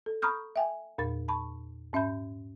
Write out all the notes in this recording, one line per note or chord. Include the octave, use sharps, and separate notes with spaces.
A4
A#5 B5 C#6 D#6 F6 G6
E5 G5 G#5
E2 A#2 A#4 A6
A5 B5 C#6
G#2 C#4 E5 B5 G6